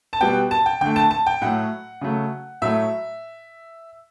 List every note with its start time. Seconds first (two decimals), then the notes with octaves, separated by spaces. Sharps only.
0.13 A5
0.21 B2 G3 B3 G5
0.51 A5
0.66 G5
0.81 D3 A3 G5
0.96 A5
1.11 A5
1.26 G5
1.42 A2 F#3 A3 F#5
2.01 C#3 F#3 A3
2.62 A2 F#3 A3 E5